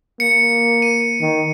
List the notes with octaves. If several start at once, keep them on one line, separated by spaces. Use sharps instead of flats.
A#3 C#7
D#7
D#3